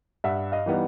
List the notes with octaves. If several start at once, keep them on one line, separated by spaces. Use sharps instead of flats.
G2 E5 F#5
D#5 F5
E3 G3 B3 D#4